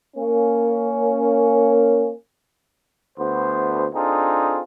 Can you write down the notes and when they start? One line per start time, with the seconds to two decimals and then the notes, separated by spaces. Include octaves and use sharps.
0.16 A#3 C#4
3.18 D2 B3 C5
3.94 C4 D4 D#4 F4 G#4 A4